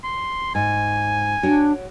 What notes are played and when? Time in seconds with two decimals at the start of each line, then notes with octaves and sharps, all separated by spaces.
0.04 C6
0.55 G#2 G#5
1.43 D4 F#4 C#5 G5